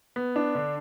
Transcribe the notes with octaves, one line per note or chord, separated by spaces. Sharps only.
B3
D4
D3